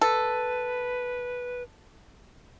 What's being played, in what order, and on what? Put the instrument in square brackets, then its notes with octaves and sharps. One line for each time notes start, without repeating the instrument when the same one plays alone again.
[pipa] A4 [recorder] B4